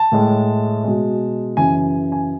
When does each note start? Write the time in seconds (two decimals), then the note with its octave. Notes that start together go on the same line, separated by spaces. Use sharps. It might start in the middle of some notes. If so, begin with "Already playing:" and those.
Already playing: A5
0.12 A2 G#3
0.84 B2 G#3
1.57 F#2 C#3 E3 G#5
2.12 G#5